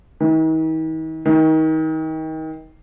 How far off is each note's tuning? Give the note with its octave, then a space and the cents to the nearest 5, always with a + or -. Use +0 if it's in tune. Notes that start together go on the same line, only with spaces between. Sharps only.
D#3 +45
D#3 +30